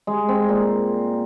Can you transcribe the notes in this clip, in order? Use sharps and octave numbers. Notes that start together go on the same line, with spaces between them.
G#3
C4
A#2